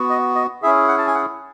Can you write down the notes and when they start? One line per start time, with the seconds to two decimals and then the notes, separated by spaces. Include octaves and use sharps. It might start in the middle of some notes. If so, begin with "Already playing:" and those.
Already playing: B3 F#4
0.09 D#5
0.35 D#5
0.62 C#4 E4 G#4 E5
0.88 F#5
0.98 A5
1.07 G#5
1.14 F#5